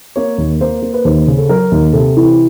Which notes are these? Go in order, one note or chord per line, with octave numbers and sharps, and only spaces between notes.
A#3 C#5
D#2
A#3 C5
A#3
B4
D#2 C5
C#3
A4
F#3 A#4
D#2
C3 A4
E3